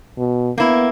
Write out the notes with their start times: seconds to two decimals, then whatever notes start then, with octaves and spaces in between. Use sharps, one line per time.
0.18 B2
0.58 A#3 B3 E4